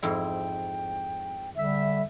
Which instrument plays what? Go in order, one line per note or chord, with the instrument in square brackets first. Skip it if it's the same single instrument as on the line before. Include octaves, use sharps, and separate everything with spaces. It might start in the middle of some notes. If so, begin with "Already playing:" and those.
[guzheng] F2 G#2 E4 [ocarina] G5
[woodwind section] D3 G3 E5